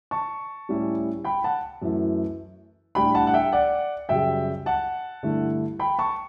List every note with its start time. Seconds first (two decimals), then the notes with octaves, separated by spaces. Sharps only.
0.11 A5 C#6
0.69 A2 G3 C#4 E4
1.25 G5 B5
1.44 F#5 A5
1.82 F#2 E3 A3 E4
2.95 A2 G3 D4 G5 B5
3.14 F#5 A5
3.27 F#5
3.34 E5 G5
3.53 D5 F#5
4.09 F#2 C#3 G3 E5 G5
4.66 F#5 A5
5.23 G2 D3 A3 E4
5.79 G5 B5
5.99 A5 C#6